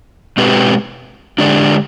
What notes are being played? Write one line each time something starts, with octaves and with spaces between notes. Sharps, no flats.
B2 G#3 C4 G4 B4
D3 G#3 D4 G4 D5